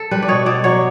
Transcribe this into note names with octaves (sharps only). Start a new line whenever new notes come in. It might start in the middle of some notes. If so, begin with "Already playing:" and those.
Already playing: A4
G3 B4
D5
B2 C#5
B2 D5
F#3 C#5